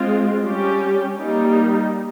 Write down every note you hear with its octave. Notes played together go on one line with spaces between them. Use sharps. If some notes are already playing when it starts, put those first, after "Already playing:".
Already playing: G#3 C4 F4
G3 C#4 G4
G3 A#3 D#4